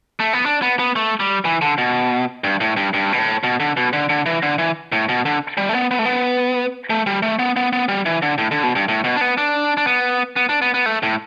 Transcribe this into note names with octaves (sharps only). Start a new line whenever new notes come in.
A3
B3
D4
B3
B3
A3
G3
E3
D3
B2
G2
A2
G2
G2
B2
A2
B2
D3
B2
D3
D3
E3
D3
E3
A2
B2
D3
G3
A3
B3
B3
A3
B3
A3
G3
A3
B3
B3
B3
G3
E3
D3
A2
D3
B2
G2
A2
B2
D4
B3
D4
D4
B3
B3
D4
B3
B3
A3
A2